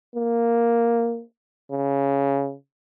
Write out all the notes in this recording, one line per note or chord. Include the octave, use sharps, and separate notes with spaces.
A#3
C#3